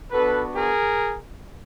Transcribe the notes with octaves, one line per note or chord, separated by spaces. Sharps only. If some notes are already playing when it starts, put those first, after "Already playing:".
B3 D4 F#4 A4 B4
G#4 A#4